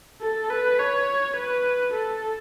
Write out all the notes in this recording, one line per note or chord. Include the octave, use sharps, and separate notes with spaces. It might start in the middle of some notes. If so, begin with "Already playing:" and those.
A4
B4
C#5
B4
A4